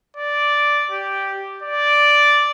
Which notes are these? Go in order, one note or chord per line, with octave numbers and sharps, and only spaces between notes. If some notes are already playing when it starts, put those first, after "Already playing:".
D5
G4
D5